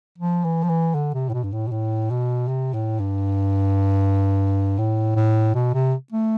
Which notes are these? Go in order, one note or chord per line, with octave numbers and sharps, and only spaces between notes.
F3
E3
F3
E3
D3
C3
A2
B2
G2
A2
B2
A2
B2
C3
A2
G2
A2
A2
B2
C3
A3